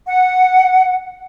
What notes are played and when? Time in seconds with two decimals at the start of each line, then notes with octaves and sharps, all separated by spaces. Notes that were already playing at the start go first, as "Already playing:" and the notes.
0.07 F#5